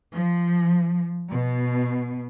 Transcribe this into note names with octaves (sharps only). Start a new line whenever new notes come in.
F3
B2